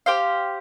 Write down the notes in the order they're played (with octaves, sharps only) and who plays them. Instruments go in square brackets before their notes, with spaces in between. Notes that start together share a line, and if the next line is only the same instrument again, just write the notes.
[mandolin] G4 C5 F5